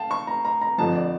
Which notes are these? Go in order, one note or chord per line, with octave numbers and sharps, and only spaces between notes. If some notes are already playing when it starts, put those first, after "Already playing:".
Already playing: F5 G5 A5
C#6
A#5
A#5
A#5
F2 D3 F3 A5
D5